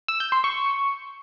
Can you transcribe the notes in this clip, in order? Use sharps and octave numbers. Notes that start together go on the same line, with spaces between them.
E6
G6
C6
C#6